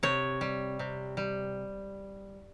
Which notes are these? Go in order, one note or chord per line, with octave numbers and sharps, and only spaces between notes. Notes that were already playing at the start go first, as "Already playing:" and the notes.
C3 C#5
G3
C3
G3